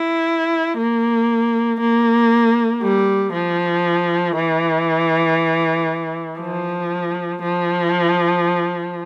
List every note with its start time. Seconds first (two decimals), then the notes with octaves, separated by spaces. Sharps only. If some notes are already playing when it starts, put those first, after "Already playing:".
Already playing: E4
0.78 A#3
1.80 A#3
2.82 G3
3.33 F3
4.36 E3
6.40 F3
7.42 F3